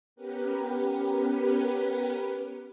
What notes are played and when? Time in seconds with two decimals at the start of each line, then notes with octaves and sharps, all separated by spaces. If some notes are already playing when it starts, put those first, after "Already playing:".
0.16 B3 C#4 G4 A#4 B4